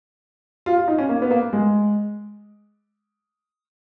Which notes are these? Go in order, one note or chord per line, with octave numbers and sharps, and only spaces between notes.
F4
F4
D#4
C#4
A#3
B3
A#3
G#3